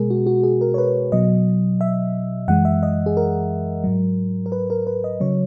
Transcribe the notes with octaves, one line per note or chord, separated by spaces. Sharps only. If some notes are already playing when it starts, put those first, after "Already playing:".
Already playing: B2 G#3 G#4 A#4
F#4
F#4
G#4
A#4
C#5
B4
B2 F#3 D#5
E5
F#2 E3 G#3 F#5
E5
D#5
G#4
A#4
G#2 F#3
A#4
B4
A#4
B4
D#5
C#3 F#3 C#5